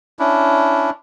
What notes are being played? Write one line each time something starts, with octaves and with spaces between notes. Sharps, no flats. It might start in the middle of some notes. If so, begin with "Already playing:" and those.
C#4 D4 E4